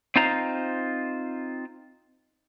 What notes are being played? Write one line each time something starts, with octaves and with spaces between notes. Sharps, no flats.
C4 D#4 F4 C5 A#5